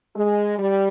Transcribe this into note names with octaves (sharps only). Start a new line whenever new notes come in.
G#3
G3